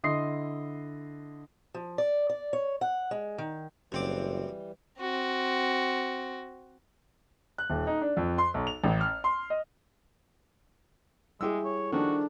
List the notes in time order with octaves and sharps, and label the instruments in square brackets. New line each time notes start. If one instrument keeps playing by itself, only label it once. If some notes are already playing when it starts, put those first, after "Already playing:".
[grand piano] D3 E4 D#5 C6 D#6 C7
[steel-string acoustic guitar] F3
D5
D5
C#5
F#5
G#3
D#3
[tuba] F#1 [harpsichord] F#2 C4 D6 [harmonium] E3 G3
[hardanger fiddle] C4 F#4
[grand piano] F#6
D#1
D#4
D4
F2
C6
B1
F7
A1
F6
C6
D#5
[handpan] G3 E4 G#4 [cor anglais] G#3 [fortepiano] G4 E6
[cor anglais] C#5
[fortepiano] D#3 F3 [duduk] D4 [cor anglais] F#4 [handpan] A4